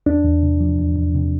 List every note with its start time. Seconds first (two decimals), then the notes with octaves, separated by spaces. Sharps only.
0.06 E2 D4
0.25 E2
0.43 C3
0.61 F3
0.79 E2
0.96 E2
1.15 C3